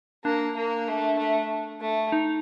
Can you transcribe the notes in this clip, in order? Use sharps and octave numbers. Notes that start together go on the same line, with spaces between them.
A#3 D4
A#3
A3
A3
A3
D#4